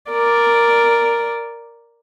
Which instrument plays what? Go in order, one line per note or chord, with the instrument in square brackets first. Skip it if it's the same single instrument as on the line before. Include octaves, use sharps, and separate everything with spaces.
[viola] A#4 D5